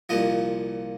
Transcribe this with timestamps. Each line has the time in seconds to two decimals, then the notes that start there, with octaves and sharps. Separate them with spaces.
0.09 C2 A#2 F3 D#5